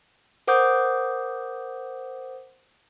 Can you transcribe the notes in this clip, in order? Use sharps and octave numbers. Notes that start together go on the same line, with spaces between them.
A#4 C5 F#5 D6 D#6 G6